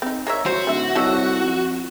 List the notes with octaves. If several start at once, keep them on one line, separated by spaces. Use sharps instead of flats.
C4 D#4
G#3 A#3 C#5 E5
F#4 C5 C#5
D1 D#3 E5
C2 G4 A4 C#5 D#5 E5 F#5
F2